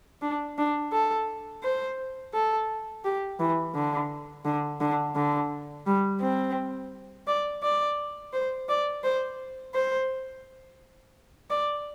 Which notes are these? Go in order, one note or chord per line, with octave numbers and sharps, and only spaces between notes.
D4
D4
A4
C5
A4
G4
E3
D3
D3
D3
D3
G3
C4
D5
D5
C5
D5
C5
C5
D5